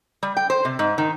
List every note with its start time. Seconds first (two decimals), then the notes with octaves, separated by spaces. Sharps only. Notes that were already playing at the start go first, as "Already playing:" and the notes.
0.23 G3
0.37 G5
0.50 C5
0.65 C3
0.79 G#2
0.98 D#3